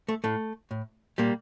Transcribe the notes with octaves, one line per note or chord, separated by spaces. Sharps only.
A3
A2 A3
A2
A#2 G3 A#3